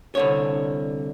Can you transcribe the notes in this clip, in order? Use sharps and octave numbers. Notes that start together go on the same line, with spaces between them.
C2 D3 C#5